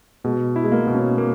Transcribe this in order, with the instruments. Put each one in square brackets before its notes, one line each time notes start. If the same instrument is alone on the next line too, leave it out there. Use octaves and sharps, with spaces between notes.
[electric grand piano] B2 [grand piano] G#3
[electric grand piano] E4
[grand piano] G#3
A#3
[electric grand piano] B2
[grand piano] C#4
[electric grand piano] A#3